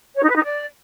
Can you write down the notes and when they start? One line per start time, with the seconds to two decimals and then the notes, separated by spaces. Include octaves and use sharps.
0.15 C#5
0.22 D#4
0.29 B4
0.36 D#4
0.43 D5